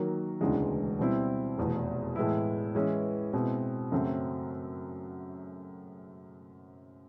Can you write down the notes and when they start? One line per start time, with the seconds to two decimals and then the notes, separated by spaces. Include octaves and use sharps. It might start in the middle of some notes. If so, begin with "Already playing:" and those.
Already playing: D#3 F#3 A#3
0.41 E1 D2 C#3 E3 G#3
0.99 B2 G3 C4 E4
1.58 F1 E2 B2
2.16 A2 E3 G#3 B3 E4
2.75 E3 G#3 C#4 E4
3.33 B2 G#3 C4 E4
3.92 F#2 C#3 F#3 A3 C4